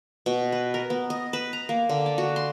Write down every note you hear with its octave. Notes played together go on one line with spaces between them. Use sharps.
B2
B4
A#4
B3
D#5
B4
A#5
A#3
D3
D5
F#4
C6